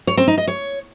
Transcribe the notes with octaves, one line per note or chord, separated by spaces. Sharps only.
C#5
C4
D#4
D#5
C#5